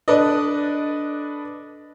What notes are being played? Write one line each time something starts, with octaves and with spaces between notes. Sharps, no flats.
D4 A4 B4 D5 D#5